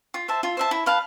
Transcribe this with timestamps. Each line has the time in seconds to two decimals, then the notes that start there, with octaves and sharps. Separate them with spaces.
0.14 F4
0.28 C5 E5 A5
0.43 F4
0.57 C5 E5 A5
0.71 E4
0.86 B4 F5 A5